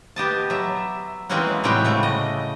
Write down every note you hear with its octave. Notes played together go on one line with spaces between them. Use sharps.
B3 G4 D#5 A5
F#3 E5
E3 G#3 A#3 C4 C#4 F#4
A2 C3 G3 G#3 F#4 G5
C#3 A3
D#5